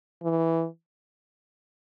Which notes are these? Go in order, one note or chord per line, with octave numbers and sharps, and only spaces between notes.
E3